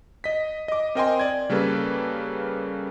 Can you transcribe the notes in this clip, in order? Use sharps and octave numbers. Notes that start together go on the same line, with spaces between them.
D#5 B6
D#5 D6
C4 A#4 D#5 G5 G#5 C6
D5 G#6
C#3 G3 A#3 A4 B4